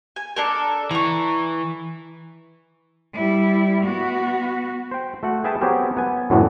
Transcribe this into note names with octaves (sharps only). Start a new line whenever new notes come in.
G#5
D4 A4 A#4
E3 A#5 C#6
G3 E4
B3 F#4
C5 G5
A3 F#4 F#5
G#4 B4 E5 G5 A5
F#3 B3 C4 G4 G#4 A#4
B3 G#5
F#2 A2 D3 E3 F#3 G#3